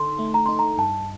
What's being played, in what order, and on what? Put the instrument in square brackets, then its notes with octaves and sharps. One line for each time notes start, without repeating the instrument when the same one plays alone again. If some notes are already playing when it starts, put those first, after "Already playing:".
Already playing: [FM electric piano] D3 D#4 A4 [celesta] C6
[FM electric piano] A3
[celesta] A#5
[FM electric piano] D#4 [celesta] C6
[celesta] A#5
[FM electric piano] G2 [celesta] A5